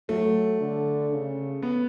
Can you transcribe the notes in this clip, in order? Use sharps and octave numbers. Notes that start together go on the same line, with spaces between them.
F#3 A3
D3
C#3
B3